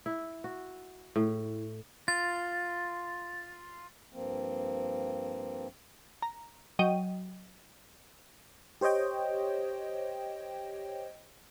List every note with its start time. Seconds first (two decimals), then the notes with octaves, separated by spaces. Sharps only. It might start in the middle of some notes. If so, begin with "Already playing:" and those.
0.06 E4
0.44 F#4
1.16 A2
2.08 F4 A6
4.13 G2 F3 A#3 C4
6.22 A#5
6.79 F#3 D#5 G5 D#7
8.81 G4 C5 C#5 D#5 G5